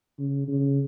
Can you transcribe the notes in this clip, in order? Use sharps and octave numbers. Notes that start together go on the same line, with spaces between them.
C#3
C#3